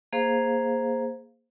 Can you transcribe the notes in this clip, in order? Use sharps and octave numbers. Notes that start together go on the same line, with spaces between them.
A#3 G#4 C5 F5